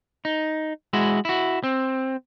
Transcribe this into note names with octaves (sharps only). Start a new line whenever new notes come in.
D#4
G#3 E4 F#4
E4 F#4
C4